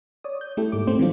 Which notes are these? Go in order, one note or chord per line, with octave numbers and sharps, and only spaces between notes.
C#5 D5 D#6
G6
A3 E4 G4 A4
G#2 A#3 D6
G#2 A3 C4 C5
E3 F#3 G3 C4 D4 F4